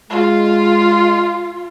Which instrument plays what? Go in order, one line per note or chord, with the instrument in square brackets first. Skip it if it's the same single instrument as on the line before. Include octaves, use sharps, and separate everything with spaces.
[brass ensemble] G#3 [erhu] F4